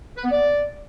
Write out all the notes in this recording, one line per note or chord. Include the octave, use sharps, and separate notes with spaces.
B4
B3
D5